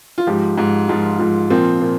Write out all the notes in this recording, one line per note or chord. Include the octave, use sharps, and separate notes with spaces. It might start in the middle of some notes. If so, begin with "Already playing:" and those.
F4
G#2 F3 G4
G#2 F3
G#2 F3 F4
G#2 F3
A#2 F3 C4
A#2